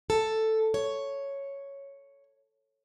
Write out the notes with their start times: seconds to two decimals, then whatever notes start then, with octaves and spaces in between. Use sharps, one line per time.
0.10 A4
0.74 C#5